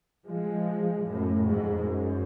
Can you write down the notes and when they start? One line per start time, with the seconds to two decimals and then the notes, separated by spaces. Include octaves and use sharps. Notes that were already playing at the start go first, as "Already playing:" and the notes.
0.26 F3 G#3
1.05 F#2 A2
1.44 F2 G#2
1.84 F#2